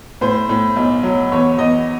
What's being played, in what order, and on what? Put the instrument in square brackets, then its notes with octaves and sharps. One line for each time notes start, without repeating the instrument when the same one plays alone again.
[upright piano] A2 C5
A2
B1
F#3
E2 C#5
E2 D#5